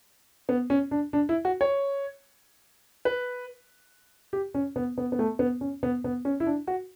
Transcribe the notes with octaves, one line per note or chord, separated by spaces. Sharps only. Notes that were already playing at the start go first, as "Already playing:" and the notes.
B3
C#4
D4
D4
E4
F#4
C#5
B4
G4
C#4
B3
B3
B3
A3
B3
C#4
B3
B3
C#4
E4
D4
F#4